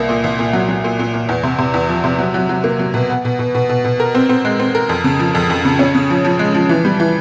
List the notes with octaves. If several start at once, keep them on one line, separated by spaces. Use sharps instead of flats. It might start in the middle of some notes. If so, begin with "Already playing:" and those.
Already playing: C2 A#3
A#2
C2
A#2
F#3
F#3
A#2
A#2
A#2
E2
C3
C3
E2
F3
C3
F#3
F#3
F#3
A#3
F#3
B2
B3
B2
B2
B2
B2
B2
A#4
C4
C4
G#3
C4
A#4
F2
C#3
F3
F2
F2
C#3
C#4
C#3
F3
F3
G#3
F3
E3
G3
E3